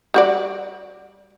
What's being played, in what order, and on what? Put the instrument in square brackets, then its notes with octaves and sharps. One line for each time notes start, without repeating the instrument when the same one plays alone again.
[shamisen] G3 F#4 D5